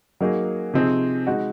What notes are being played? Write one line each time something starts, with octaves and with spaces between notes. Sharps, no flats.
F#3 A#3 D#4 G#4
C3 F3 C4 D#4 G#4
G#3 D#4 F#4